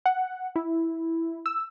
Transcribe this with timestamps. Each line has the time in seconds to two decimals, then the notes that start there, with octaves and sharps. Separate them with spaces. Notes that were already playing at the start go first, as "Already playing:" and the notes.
0.06 F#5
0.56 E4
1.46 E6